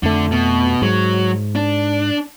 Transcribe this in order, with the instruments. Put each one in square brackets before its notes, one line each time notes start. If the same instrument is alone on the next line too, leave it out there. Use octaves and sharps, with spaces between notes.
[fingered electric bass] F2 A3 [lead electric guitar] D3
[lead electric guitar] B2
[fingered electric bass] G#2 [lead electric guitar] F#3
[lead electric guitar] D4